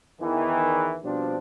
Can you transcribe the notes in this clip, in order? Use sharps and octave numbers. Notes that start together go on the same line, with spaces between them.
E2 D#3 E3
B2 F3 G3 C4 D4